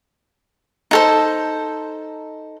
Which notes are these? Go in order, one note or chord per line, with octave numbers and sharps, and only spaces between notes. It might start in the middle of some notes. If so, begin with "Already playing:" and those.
D#4 A4 C5